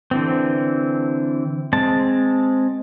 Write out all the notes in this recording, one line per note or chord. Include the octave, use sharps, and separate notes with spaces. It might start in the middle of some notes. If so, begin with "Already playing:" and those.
D3 E3 C4
G#3 C4 A5